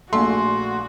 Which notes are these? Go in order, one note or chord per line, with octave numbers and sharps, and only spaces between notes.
A#1 A#2 A3 F#4 G#5 C6